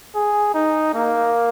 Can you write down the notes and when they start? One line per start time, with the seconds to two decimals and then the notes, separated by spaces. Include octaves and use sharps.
0.15 G#4
0.54 D#4
0.95 A#3